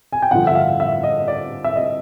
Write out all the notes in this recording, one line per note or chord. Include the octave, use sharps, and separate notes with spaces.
G#5
G5
G2 D3 F3 F#5
E5
F5
E5
D#5
D5
E5
D#5